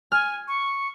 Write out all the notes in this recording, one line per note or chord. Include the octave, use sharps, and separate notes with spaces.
G#5 F6
C#6